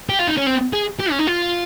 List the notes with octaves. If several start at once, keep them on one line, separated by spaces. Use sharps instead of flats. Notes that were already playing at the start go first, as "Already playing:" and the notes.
G4
F4
D#4
C#4
C4
G#4
G4
C#4
D#4
F4